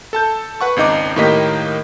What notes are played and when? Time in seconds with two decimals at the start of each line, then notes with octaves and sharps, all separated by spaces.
0.13 A4 A5 G6
0.61 B4 F#5 C#6
0.76 G#1 C#2 D#4 D#5 D6
1.16 A2 D#3 A#3 G4 D#5 B6